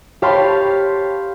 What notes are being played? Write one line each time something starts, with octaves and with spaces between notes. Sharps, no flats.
G4 C#5 F5 A5 B5 C6